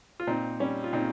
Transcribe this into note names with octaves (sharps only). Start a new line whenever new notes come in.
F4
A#2 C4 D#4
G3 C#4
F4
A#2 C4 D#4